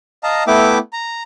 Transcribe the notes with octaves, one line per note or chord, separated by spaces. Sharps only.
D#5 F5 A5 A#5
A3 B3 E4 E5 G5 D6
A#5